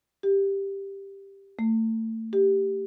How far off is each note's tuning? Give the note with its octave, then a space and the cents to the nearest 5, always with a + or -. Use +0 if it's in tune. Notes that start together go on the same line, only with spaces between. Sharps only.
G4 +5
A3 +30
G4 +0